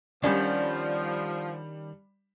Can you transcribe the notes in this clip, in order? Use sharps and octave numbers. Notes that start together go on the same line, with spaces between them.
D#3 F3 G3 C#4 D4 D5 F#5 G6